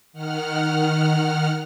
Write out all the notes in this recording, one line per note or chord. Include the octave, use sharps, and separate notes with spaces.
D#3 F#5 F6